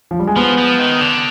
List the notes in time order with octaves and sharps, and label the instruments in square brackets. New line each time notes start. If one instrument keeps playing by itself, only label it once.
[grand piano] F3
G3
G#3
[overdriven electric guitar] F3 [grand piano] B3
[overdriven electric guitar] F3
D#3
D3